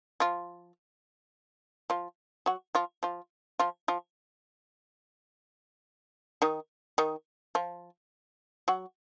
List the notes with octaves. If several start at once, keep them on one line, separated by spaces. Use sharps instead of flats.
F3 F4
F3 F4
F#3 F#4
F3 F4
F3 F4
F3 F4
F3 F4
D#3 D#4
D#3 D#4
F3 F4
F#3 F#4